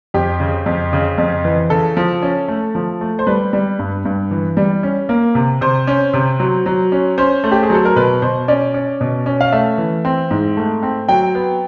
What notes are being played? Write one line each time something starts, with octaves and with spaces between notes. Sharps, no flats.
F2 G4
C#3
F2
C#3
F2
E3
C#3 A4
F3
C#4
A3
F3
A3
C5
G3 B4
G3
G2
G2
E3
G3
C#4
A#3
C3
C3 C5
C#4
C3
F#3
F#3
C#4
C#4 C5
A3
G4
G#4
F#3 A4
A#4
B2 B4
B2 C5
C#4 D5
C#4
B2
C#4
F5
A3 E5
E3
C4
G#2
A3
C4
F#3 G5
B3